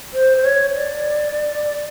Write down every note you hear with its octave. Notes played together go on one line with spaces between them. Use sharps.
C5
C5
C#5
D5